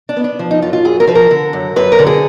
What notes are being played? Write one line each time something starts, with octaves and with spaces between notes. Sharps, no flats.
D4
B3
D4
F3
D#4
F#2 F4
F4
F#2 G#4
A#4
F3 B4
A#4
D3
F#2
F#2 B4
A#4
D3
G#4